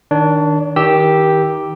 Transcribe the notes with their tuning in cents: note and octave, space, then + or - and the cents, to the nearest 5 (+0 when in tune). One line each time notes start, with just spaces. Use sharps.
D#3 +0 D4 +0 C#5 +40
D#3 +25 G4 +0 E6 -5